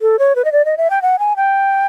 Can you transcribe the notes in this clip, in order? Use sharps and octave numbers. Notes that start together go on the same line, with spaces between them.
A4
C#5
B4
D#5
D5
D#5
E5
G5
F#5
G#5
G5